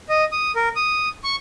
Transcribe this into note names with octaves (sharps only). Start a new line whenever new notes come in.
D#5
D#6
A#4
D#6
C#6